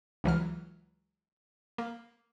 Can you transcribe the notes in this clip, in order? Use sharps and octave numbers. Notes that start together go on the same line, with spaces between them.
C#2 E3 F#3 F6
A#3